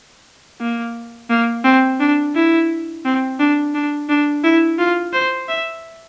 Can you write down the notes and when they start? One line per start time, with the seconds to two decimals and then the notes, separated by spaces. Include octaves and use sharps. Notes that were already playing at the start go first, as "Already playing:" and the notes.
0.61 A#3
1.30 A#3
1.64 C4
2.00 D4
2.35 E4
3.05 C4
3.40 D4
3.75 D4
4.09 D4
4.44 E4
4.79 F4
5.13 C5
5.49 E5